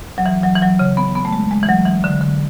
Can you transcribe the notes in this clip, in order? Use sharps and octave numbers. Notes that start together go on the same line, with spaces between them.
F#3
E3
F#3
E3
F#3
C#3
B3
B3
A3
G#3
G#3
E3
F#3
E3
D3
D3